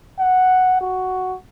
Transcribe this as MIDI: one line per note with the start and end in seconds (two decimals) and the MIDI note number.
0.20 0.79 78
0.81 1.36 66